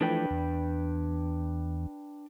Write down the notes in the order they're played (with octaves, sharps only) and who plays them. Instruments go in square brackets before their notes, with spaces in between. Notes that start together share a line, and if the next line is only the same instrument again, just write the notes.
[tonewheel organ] E3 F3 A3 [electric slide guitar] D4 B4 G5
[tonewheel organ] E2